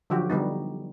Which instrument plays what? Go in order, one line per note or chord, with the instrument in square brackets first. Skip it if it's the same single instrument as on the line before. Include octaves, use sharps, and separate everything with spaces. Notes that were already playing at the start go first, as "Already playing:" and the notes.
[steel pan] D3 F3 F#3 F#4 G4
D3 G3 B3 D#4